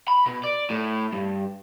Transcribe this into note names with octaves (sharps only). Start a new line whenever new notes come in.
B5
B2
D5
A2
G2